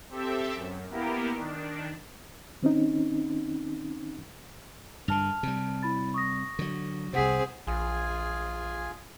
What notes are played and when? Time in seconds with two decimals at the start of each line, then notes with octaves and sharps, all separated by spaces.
0.10 C4 G4 A4 E5
0.54 F#2
0.90 A#3 B3 E4 G4 A#4
1.34 D#3 D4
2.62 D#3 C4 C#4 D#4
5.08 G2 D3 A5 F6 F7
5.43 C3 G3
5.83 E4 B5 A6
6.14 C#6 D#6 A#6
6.59 D3 F#3
7.13 C2 C3 C4 G#4 C5 F#5 B6
7.67 A#1 F4 G#4 G#5